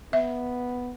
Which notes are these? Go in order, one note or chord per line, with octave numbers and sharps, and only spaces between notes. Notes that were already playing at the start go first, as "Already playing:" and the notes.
B3 E5